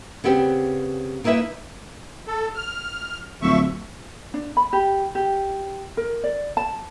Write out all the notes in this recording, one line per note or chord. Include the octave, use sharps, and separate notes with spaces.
C#3 B3 C4 G4
A#3 D#4 E4 B4 E5
A4
F6
D1 F3 E5 C#6
D4
B5
G4
G4
A#4
D5
A5